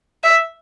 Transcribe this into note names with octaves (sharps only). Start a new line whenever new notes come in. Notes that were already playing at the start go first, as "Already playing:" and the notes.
E5